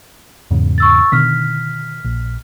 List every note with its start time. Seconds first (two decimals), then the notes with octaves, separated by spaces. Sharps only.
0.51 E2 G#2 C#3
0.78 C#6 E6 A6
1.12 B2 D3 D#3 F6 B6
2.05 A#1